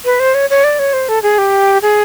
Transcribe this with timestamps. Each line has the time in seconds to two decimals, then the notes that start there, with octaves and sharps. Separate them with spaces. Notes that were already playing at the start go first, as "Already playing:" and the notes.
0.05 B4
0.20 C5
0.34 C#5
0.50 C#5
0.64 D5
0.79 C#5
0.93 C5
1.09 A4
1.23 G#4
1.38 G4
1.82 G#4